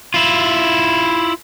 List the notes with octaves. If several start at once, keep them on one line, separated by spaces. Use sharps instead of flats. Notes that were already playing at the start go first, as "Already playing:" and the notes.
E4 F4